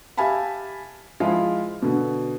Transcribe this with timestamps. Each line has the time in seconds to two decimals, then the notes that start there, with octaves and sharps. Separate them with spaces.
0.17 G4 E5 F5 G#5 A5 B5
1.20 F3 G#3 E4 F4
1.82 B2 D3